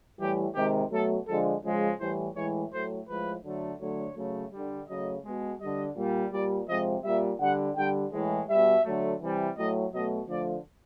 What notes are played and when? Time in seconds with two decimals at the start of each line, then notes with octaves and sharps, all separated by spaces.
0.19 A2 E3 G3 G4
0.55 C3 D#3 G#3 G4
0.91 B2 F#3 A3 A4
1.27 D3 F3 G#3 A4
1.63 C#3 F3 G#3
1.99 A2 E3 G3 C5
2.35 A2 E3 G#3 C#5
2.71 A2 F#3 A3 C5
3.07 A2 F3 G#3 B4
3.43 D3 F#3 A3
3.79 D3 F#3 A3 C#5
4.15 C#3 F#3 A3
4.52 D3 G3
4.88 C#3 F#3 A3 D#5
5.23 B2 G#3
5.60 D3 G3 D#5
5.96 A#2 G3
6.32 A#2 G3 D5
6.68 C3 F3 G#3 D#5
7.04 A#2 G3 E5
7.40 D3 G3 F#5
7.76 D3 G3 G5
8.12 A2 E3 G#3
8.48 B2 G3 E5
8.85 D3 F#3 A3
9.21 C3 E3 G3
9.56 A2 F#3 A3 D#5
9.93 B2 F#3 A3 D#5
10.29 D3 F3 A3 D5